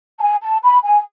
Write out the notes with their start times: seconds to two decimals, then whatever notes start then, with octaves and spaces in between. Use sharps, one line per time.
0.18 A5
0.22 G#5
0.43 A5
0.64 B5
0.85 G#5